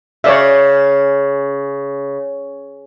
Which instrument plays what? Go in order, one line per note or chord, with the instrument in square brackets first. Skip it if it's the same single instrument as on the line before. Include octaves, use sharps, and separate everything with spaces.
[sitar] C#3 [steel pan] C#5 D5 E5